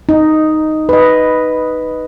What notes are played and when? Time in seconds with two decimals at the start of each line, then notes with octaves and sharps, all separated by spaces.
0.09 D#4
0.89 B4 D#5